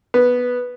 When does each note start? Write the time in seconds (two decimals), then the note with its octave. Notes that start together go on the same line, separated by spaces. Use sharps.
0.14 B3